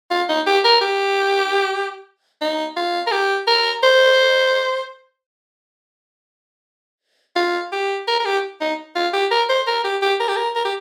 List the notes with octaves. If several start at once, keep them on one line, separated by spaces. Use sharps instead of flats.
F4
D#4
G4
A#4
G4
D#4
F4
A#4
G4
A#4
C5
F4
G4
A#4
A#4
G4
D#4
F4
G4
A#4
C5
A#4
G4
G4
A#4
G4
A#4
A#4
G4